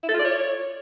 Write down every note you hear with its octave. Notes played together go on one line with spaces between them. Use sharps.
E4
A4
F4
D5
C#5